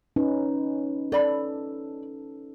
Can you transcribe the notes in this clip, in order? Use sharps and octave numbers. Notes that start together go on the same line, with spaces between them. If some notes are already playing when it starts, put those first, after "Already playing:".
C#4 D#4 B4
A4 D5 B5